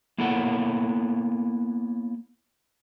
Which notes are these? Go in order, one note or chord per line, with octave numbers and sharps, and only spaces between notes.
A#3 B3 E4 A4 C#5 F#5